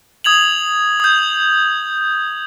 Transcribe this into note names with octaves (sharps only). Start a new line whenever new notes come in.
D#6 G#6 F7 F#7
D#6 G6